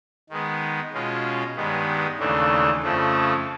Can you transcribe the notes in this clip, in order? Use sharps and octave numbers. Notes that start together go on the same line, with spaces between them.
D#3 G#3 B3
B2 G#3 C#4 F4
G2 D#3 G#3 B3
D#2 C#3 E3 A3 D4
F2 C#3 F3 A3